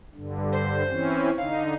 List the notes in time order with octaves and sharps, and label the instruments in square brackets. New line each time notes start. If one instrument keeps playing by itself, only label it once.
[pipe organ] G2 D3
[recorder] C5
[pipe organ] E3 C4 C#4
[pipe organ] D3 D#4 [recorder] F5